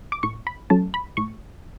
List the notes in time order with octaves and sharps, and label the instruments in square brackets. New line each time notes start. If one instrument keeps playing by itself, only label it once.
[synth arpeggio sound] D6
A2 C#6
B5
F#3 A3 C#4 A5
B5
A2 C#6